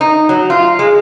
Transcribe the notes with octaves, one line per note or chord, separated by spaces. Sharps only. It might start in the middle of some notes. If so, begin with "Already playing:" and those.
D#4
F#3
F4
G#3